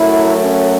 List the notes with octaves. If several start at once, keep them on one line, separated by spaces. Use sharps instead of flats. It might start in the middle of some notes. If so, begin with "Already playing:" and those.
Already playing: F#2 F#3 A3 E4
C#4